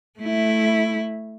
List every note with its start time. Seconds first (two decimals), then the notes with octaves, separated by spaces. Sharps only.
0.19 A3 E4